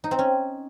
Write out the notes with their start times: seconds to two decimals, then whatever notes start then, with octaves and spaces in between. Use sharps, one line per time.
0.04 D#4
0.11 C4
0.19 C#4